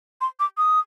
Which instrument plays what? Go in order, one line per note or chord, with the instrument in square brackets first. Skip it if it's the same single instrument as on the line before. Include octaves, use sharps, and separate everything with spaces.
[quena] C6
D6
D#6